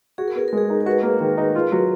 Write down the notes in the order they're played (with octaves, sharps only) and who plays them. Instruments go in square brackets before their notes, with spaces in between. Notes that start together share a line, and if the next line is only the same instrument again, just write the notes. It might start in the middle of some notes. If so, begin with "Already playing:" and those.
[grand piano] F#4 [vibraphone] G#4
[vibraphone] A#4
[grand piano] B3 [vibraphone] G#4
[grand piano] G#3 [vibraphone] A#4
[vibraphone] G#4
[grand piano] D#4
[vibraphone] A#4
[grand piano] F#4 [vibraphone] B4
[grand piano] A#3
D#3
D#4
F4
F#3